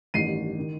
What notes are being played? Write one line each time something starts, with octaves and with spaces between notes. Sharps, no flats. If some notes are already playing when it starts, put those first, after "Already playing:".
A1 G2 D#3 C7 D#7
D#3